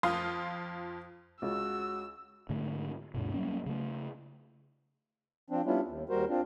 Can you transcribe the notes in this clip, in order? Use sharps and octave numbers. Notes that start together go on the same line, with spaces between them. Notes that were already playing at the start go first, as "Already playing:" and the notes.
F2 F4 F5 C6 D#6
C#2 F#4 E6
G#2 D3 A3
D2 G2 B2
F#3 G3 A#3 C#4
C#3 A3
F3 C4 D4
G3 B3 C#4 D4 E4 F4
D#2
D#2 G3 F#4 A#4 C5
C4 D4 F4